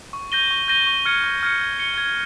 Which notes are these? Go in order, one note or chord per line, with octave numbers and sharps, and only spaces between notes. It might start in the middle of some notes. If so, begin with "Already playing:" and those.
C#6
G6 A#6 D#7 G7
C#6
G6 A#6 D#7 G7
C#6
F6 G#6 C#7
C#6
F6 G#6 C#7
G#6
C#7 G7
G#6